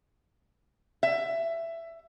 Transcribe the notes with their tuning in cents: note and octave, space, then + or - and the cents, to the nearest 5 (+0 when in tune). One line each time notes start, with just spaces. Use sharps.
E5 +15